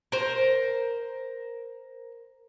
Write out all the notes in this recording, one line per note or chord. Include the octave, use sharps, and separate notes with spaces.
A#4 C5